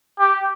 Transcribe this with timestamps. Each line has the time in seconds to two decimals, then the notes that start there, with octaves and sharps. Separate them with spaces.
0.19 G4